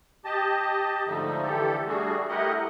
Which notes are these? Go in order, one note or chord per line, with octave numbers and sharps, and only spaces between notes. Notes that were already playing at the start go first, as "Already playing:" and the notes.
G4 D#5 A5
G#2 D3 F3 A3 D#4
D3 E3 G4 A4
G3 A3 D4 F#4 G#4
A3 E4 G4 A#4 D#5 F#5